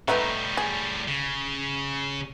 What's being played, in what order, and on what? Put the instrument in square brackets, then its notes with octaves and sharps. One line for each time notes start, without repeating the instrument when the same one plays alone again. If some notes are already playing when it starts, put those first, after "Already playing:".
[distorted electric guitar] A2 G3 [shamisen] A3 B3 D#4
[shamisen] G#4
[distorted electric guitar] C#3